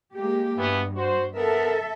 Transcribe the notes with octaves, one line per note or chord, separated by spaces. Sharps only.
G#3 A#3 G4
G2 B2 E3 B3
F#4 C5
B3 A4 A#4 E5